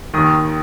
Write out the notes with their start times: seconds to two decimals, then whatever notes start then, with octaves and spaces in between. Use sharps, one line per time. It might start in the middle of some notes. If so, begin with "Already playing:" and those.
0.14 D#2 D#3 D#6